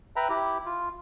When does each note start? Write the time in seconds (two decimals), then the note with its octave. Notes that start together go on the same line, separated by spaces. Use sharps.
0.16 B4 E5 G5 A#5 B5
0.29 E4 G4
0.66 F4